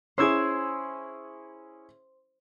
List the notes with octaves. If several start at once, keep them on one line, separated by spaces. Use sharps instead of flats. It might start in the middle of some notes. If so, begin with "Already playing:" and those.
C#4 E4 G#4 C5 E6 G#6